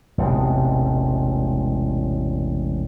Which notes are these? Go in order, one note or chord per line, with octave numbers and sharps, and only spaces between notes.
E1 A1 C3 G#3